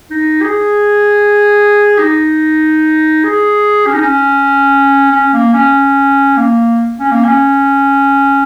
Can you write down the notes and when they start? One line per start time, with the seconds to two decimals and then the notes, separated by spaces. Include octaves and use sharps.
0.11 D#4
0.43 G#4
1.99 D#4
3.24 G#4
3.87 C#4
3.94 D#4
4.01 C#4
5.12 C#4
5.33 A#3
5.54 C#4
6.37 A#3
7.00 C#4
7.12 A#3
7.24 C#4